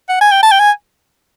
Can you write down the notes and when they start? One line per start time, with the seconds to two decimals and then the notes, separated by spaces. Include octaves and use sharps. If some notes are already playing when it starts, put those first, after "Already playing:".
0.09 F#5
0.21 G#5
0.31 G5
0.42 A5
0.51 G5
0.59 G#5